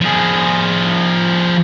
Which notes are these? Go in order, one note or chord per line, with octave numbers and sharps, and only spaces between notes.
F3 G#4